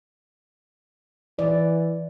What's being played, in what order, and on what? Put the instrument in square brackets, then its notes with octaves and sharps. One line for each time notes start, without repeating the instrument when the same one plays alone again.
[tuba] E3 [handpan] D5